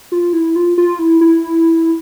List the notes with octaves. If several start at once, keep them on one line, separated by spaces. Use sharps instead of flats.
F4
E4
F4
F4
E4
E4